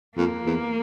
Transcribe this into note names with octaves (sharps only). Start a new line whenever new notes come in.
F2 A#3
E2